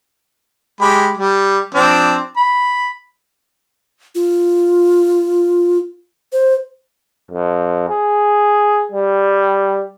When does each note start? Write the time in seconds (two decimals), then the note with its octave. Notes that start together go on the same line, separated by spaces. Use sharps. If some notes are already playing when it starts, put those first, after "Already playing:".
0.81 G#3 G4 B5
1.17 G3
1.75 F3 C4 D4
2.37 B5
4.15 F4
6.33 C5
7.31 F2
7.89 G#4
8.92 G3